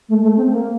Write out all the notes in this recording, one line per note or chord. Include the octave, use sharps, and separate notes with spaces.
A3
A3
C4
A#3